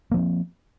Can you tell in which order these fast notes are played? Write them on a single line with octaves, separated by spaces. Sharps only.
A#3 F3 C4